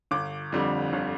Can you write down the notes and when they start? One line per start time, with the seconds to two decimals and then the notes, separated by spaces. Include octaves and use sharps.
0.11 G1 D6
0.52 F2 D3 G3
0.93 G1